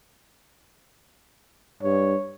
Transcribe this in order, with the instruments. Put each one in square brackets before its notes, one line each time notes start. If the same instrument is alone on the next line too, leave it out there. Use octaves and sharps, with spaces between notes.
[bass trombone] G2 [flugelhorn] C#5